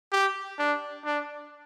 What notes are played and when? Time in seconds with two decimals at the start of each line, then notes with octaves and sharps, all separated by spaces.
0.12 G4
0.59 D4
1.05 D4